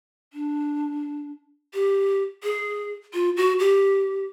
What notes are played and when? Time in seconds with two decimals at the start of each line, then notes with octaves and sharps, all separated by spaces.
0.33 D4
1.74 G4
2.43 G#4
3.13 F4
3.37 F#4
3.59 G4